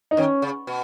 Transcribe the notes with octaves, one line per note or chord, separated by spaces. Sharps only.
D#4
D#3 C#4
C#3
B2